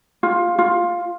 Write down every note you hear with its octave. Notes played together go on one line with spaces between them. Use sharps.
F4
F4